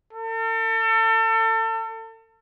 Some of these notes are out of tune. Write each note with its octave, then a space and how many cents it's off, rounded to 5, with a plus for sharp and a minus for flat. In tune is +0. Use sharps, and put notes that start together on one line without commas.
A4 +35